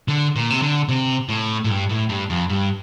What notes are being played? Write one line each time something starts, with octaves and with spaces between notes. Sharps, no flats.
D3
A#2
C3
D3
C3
A2
A2
G2
A2
G2
F2
G2